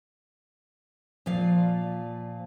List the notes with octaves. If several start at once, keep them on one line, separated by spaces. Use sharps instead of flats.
A#2 F3 D5 F5